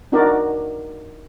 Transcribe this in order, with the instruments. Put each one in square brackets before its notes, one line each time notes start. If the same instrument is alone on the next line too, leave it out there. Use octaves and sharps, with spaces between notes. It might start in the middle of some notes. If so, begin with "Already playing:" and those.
[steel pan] D4 D#4 F#4 A#4 D5